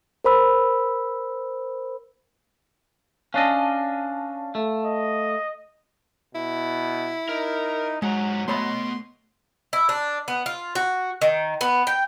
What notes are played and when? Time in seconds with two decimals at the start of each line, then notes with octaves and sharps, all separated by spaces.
0.24 A#4 C5 B5 E6
3.34 C#4 D4 D#5 F5 A5
4.55 A3
4.86 D#5
6.35 B2 E4
7.29 D#4 A#4
8.02 G#2 F#3 G#3 F#5 A#5
8.48 A3 B3 C#5 D#5 B5 C6
9.73 E4
9.89 D4
10.28 B3
10.46 F4
10.75 F#4
11.22 D#3
11.61 B3
11.87 G5